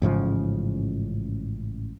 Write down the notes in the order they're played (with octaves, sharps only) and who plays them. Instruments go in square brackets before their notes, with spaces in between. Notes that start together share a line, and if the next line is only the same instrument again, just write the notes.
[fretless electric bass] A1 G#2 C#3 F3